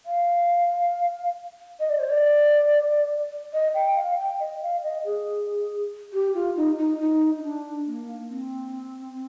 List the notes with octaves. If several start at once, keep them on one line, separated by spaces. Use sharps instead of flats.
F5
D#5
D5
C5
D5
D#5
G5
F5
G5
D#5
F5
D#5
G#4
G4
F4
D#4
D#4
D#4
D#4
D4
A#3
C4